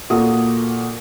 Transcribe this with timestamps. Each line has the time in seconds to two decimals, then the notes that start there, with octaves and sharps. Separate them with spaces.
0.10 A#2 A#3 F#4 A4 D#6